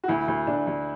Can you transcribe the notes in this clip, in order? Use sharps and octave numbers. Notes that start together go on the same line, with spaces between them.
F#4
D2 E4
D2
D2 D4
D2